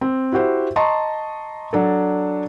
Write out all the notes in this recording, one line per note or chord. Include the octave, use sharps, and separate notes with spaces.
C4
E4 F#4 G4 C5 E5
D#5 A5 A#5 C6 C#6
F#3 D4 A4